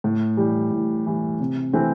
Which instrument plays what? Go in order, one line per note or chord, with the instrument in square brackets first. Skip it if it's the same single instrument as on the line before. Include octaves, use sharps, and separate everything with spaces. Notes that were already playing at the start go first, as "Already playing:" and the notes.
[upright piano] A2
E3 G3
A2
E3 G3
C3
E3 A3 C4